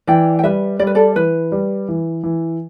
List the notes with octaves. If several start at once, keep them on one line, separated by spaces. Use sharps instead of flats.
E3 D5 G5
G5
G3 B4 E5
G3 D5
B4
A4 D5
E3 B4
G3
E3
E3